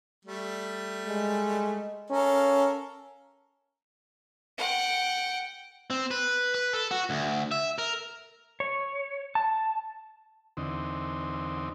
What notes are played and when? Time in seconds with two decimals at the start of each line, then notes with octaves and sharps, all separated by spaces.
0.25 G3 A3
1.06 G#3
2.10 C#4 A4 A#4 F5
4.58 F#5 G5
5.90 C4
6.11 B4
6.55 B4
6.73 A4
6.91 F#4
7.10 D2
7.52 E5
7.78 A#4
8.60 C#5
9.35 A5
10.57 E2 D3 C4 D#4